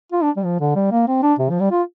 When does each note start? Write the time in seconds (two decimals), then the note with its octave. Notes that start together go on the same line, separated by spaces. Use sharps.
0.12 F4
0.23 D4
0.37 G3
0.44 F3
0.60 D3
0.75 G3
0.91 A#3
1.07 C4
1.23 D4
1.39 C3
1.50 F3
1.60 G3
1.71 F4